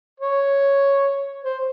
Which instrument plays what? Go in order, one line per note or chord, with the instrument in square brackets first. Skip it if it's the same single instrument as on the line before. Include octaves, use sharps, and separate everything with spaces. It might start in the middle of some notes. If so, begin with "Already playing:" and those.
[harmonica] C#5
C5